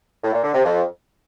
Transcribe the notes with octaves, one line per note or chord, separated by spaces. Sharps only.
A2
A#2
D3
C3
F2